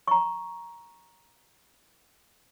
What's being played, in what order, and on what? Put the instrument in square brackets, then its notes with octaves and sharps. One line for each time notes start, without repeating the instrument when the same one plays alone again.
[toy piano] A#5 C#6